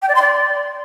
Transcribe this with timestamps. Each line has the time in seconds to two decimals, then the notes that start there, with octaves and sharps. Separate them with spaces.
0.02 G5
0.09 D5
0.15 C6
0.22 D5